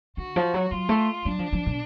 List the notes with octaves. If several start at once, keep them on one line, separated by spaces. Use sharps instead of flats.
D3 F#4
F3
F#3
F#3 F4
A3
F#3 D4
F3
F3
B2